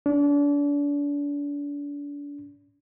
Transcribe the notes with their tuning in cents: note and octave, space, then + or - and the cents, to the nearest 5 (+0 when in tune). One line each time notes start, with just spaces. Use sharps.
D4 -35